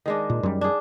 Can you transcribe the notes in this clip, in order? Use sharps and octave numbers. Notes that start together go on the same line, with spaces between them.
D#3 G#3 D4
A#2
F#2 G3
D4 G#4